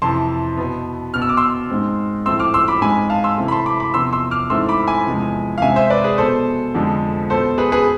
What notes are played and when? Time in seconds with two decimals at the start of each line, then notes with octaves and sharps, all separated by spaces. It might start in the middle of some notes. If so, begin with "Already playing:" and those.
0.02 F2 C3 E3 A5 C6
0.57 B2 B3
1.14 B2 B3 F6
1.22 E6
1.29 D6
1.37 C6 E6
1.70 G#2 G#3 C4
2.26 A2 F3 A3 C4 C6 E6
2.39 D6 F6
2.54 C6 E6
2.68 B5 D6
2.82 G#2 G#3 C4 G#5 B5
3.10 F5 A5
3.24 C6 E6
3.38 C3 E3 A3 C4
3.48 B5
3.52 A5 C6
3.66 B5 D6
3.80 B5 D6
3.94 E2 C3 F3 B3 C6 E6
4.13 C6 E6
4.31 D6 F6
4.50 G#2 E3 A3 C4 C6 E6
4.69 B5 D6
4.87 G#5 B5
5.06 E2 C3 F3 G#3
5.58 F5
5.62 C3 G#3 C4 E5 G#5
5.76 C5 E5
5.90 B4 D5
6.04 G#4 B4
6.18 B2 B3 A4 C5
6.74 F2 D3 F3 G#3
7.30 B2 B3 A4 C5
7.58 G#4 B4
7.72 G#4 B4